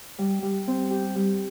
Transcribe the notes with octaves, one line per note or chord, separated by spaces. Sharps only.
G3
G3
C4
G4
G3